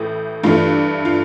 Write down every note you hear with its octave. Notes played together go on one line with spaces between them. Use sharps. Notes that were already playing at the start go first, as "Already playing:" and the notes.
Already playing: A1 A2 E3 A3
G2 E3 A3 F4
F4